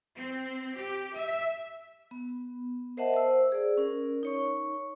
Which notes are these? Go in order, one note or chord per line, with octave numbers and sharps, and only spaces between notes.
C4
G4
E5
B3
A#4 C5 D#5 E5 F#5 A5
C5 E6
G#4 D5
C#4 A#4
D#4 C#5 C#6